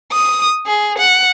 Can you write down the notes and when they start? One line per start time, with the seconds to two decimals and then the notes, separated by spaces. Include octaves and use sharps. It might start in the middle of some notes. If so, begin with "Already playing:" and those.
0.12 D#6
0.66 G#4
0.98 F#5